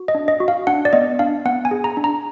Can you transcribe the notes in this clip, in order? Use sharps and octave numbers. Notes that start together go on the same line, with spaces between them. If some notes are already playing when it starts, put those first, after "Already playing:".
Already playing: F#4
D#5
D4
D#5
F#4
F5
D4 F#5
D5
B3 D#5
D4 F5
B3 F#5
G#5
G#4
A#5
D4
A#5